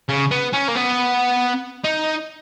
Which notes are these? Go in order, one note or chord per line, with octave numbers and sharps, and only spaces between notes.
C#3
B3
C#4
A#3
B3
D#4